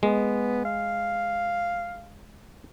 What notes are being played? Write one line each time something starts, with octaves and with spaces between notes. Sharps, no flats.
G#3 B3
F5